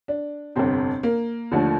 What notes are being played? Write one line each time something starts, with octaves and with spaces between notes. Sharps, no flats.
D4
G1 F2 C3 C4
A#3
D#2 D3 F3 A3